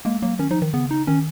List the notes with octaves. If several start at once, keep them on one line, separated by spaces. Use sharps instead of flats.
G#3 A#3
F#3 A#3
D#3 C#4
F3 D#4
D#3
C#3 B3
D#4
D#3 C#4